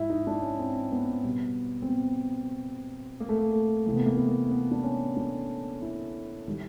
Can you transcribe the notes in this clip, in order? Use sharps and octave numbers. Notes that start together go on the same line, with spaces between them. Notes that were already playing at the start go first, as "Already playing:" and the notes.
Already playing: G#2 F3 E4
D#4
D4
C#4
C4
B3
B2 G3
C4
B3
A#3
A3
A#3
A3
C3 E3 A3 A#3
B3
A#3
B3
A#3
B3
D4
C#4
D4
E4
D#3 G3